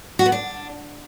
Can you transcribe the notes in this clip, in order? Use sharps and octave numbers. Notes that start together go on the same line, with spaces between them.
F#4
B3
D4